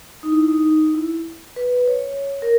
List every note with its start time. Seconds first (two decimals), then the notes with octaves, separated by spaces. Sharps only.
0.23 D#4
0.32 E4
0.48 D#4
0.95 E4
1.56 B4
1.88 C#5
2.42 A#4